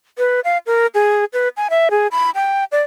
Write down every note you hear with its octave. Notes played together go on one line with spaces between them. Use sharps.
B4
F5
A#4
G#4
B4
G#5
E5
G#4
B5
G5
D5